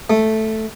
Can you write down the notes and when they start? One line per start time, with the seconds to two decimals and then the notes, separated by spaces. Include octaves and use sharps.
0.10 A3